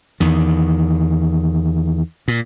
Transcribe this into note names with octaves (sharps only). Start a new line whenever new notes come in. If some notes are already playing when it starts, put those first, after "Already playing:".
E2 D#3
A#2